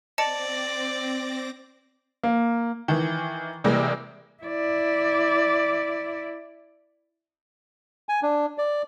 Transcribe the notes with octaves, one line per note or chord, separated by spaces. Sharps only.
C4 D5 D#5 A5 D6 A#6 C#7
A#3
D#3 E3
C3 E3 G3 G#3 A#3
E4 D5
G#5
D4
D5